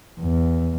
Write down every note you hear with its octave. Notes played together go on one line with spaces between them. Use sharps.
E2